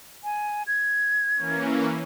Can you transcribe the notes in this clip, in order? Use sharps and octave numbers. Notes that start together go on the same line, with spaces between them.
G#5
G#6
E3 A#3 C#4